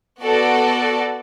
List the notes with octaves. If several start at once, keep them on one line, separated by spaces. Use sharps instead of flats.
B3 F#4 A4 D5